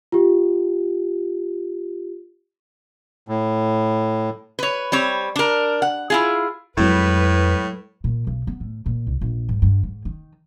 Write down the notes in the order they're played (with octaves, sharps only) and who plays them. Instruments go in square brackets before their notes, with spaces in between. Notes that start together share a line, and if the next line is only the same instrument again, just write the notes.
[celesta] F4 G4
[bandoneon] A2
[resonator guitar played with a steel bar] B4 C#5
G3 C4 C#5
D4 A#4
F#5
E4 F4 G#4
[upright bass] F2 C4 [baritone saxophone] A2 [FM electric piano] F#3 G#3 E4 [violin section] B4
[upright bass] A#2
B1
B3
A2
A#2
C2
A#1
G#2
G2
G#2
D#3